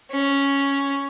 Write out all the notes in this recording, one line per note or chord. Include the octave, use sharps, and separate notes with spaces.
C#4